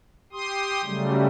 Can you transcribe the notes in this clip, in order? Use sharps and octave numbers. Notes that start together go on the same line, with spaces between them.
G4 C6 D#6
C#3 F#3 G3 A3